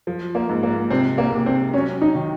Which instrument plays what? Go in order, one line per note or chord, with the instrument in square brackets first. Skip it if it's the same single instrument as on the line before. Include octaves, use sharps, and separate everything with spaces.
[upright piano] F3
[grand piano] A#3
[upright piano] G#2
[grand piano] A#3
[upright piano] C3 [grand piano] C4
[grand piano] A#3
[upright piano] C3
[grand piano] C4
[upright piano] F#3 [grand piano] C#4
[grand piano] D#4
[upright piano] D#3